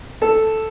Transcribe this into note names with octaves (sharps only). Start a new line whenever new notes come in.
A4